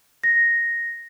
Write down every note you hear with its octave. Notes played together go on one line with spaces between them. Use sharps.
A#6